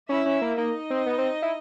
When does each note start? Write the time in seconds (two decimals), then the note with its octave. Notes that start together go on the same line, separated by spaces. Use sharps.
0.09 C#4 E4 E5
0.26 C#4
0.42 A#3
0.58 A#3 D#4 D#5
0.90 C4
1.06 B3
1.18 C4
1.42 E4